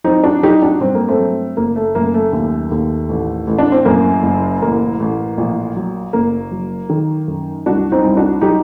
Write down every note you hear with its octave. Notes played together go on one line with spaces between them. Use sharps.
F#3 C4 D#4
D4 F#4
F#3 D#4 G4
D4 F#4
G2 C4
A#3
A3 C4
F#3
F#1 A#3
A3
F#2 A#3
A3
D#2
D#2
A1
A1
D4
C4
F#2 A#3
F#1
A1 A#3
A1
A#1
F#3
F#1 A#3
F#3
D#3
F#2
C2 D4 F#4
C4 D#4
C2
D4 F#4
F#3 D#4 G4